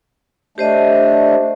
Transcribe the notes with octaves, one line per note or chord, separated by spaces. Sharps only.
A3 D4 G4 C5 D#5